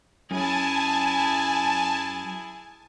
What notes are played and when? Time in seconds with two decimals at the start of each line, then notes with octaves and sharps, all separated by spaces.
0.31 F#2 E4 G#4 G#5 A5